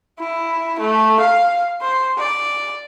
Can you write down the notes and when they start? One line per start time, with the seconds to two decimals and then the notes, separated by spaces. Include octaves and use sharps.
0.19 E4
0.80 A3
1.20 F5
1.81 C5
2.18 D5